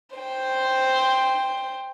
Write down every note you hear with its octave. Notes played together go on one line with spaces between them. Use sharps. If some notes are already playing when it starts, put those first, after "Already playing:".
C5 G5